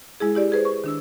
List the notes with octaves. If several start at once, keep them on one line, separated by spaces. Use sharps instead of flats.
G#3 E4 G#4
E4 G4 D5
G#4 B4 C5
C#6
D#3 D4 E6